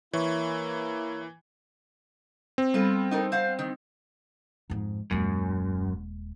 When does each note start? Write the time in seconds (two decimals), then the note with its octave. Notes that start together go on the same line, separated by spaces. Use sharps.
0.13 E3 A#3 E4 C#5 E5 C#6
2.58 C4
2.74 G3 B3 F4 A4
3.11 D#4 A4 A#4 G5
3.32 C5 F5 F#5
3.59 D#3
4.70 F2 G#2
5.11 D#1 F#2 G#3